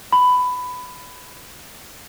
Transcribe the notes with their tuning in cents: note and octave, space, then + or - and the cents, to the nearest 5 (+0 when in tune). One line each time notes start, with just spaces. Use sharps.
B5 +15